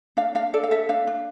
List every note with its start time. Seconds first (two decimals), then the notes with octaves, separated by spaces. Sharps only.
0.17 D4 F5
0.35 D4 F5
0.54 A4 D5
0.63 F5
0.71 A4 E5
0.89 D4 F5
1.07 D4